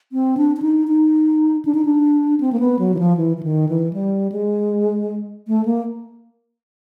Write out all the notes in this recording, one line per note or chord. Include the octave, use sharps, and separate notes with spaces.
C4
D4
D4
D#4
D#4
D4
D#4
D4
C4
A#3
B3
F#3
E3
F3
E3
E3
D#3
E3
G3
G#3
A3
A#3